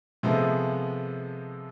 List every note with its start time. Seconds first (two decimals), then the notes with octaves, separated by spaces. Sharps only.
0.23 C3 F3 G#3 A3 B3